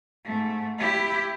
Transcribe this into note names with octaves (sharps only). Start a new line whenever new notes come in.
G#2 A3
E4 G4